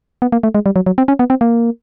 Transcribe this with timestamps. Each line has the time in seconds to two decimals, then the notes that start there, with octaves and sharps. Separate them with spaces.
0.22 B3
0.32 A#3
0.43 A3
0.55 G#3
0.66 G3
0.76 F#3
0.86 F#3
0.98 C4
1.08 C#4
1.19 B3
1.30 C4
1.41 A#3